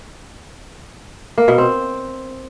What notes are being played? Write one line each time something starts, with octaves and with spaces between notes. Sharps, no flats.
A#3
B2
C4